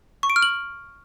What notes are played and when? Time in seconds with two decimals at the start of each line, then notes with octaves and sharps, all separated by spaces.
0.23 C#6
0.30 D7
0.36 F6
0.42 F#7